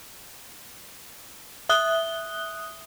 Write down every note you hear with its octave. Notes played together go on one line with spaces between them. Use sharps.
E5 D#6 F#6 G7